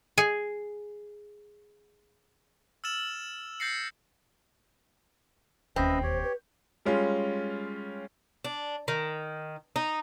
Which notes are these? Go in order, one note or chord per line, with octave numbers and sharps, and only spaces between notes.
G#4 G#5
E6 F6 A6 E7 F#7
G6 A6 A#6 C7 C#7
E1 D#2 C4 C#4 B4 D#5 E5
G4 C5 C#5
B4
G3 G#3 C#4 F4
D4
D#3
D#4